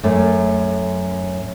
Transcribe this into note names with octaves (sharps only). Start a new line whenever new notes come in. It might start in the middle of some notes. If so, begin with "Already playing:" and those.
F#2 A3